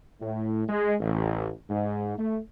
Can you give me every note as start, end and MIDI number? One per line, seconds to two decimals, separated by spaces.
0.21 0.63 45
0.68 0.94 56
1.00 1.50 33
1.69 2.13 44
2.18 2.38 57